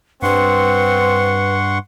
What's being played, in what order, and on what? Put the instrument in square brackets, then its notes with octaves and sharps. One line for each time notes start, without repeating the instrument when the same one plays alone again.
[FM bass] G2 [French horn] C4 [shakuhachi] B4 [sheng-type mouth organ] F#5 C6 C#6